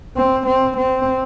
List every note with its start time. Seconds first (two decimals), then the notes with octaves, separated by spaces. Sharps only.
0.16 C4
0.47 C4
0.77 C4